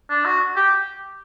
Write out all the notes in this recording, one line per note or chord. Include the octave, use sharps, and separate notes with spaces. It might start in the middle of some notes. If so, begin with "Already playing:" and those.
D4
F#4
G4